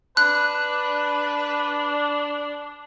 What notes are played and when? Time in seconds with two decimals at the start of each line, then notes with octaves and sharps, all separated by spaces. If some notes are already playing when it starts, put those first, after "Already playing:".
0.17 D4 B4 F#6